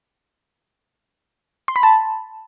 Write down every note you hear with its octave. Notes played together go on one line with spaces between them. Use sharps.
C6
B5
A5